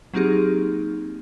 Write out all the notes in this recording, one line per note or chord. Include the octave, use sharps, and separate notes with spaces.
F#3 A#3 C4 D#4 G4 G#4